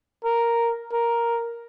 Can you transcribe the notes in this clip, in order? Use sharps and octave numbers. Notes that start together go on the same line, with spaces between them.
A#4
A#4